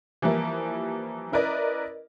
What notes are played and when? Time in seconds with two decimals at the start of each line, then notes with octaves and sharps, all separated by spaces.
0.22 E3 F3 G3 A#3 E4
1.32 C#4 E4 A#4 B4 D5 D#5